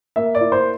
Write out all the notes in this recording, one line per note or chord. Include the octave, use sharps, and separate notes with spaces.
A#3 E5
D5
E4
C5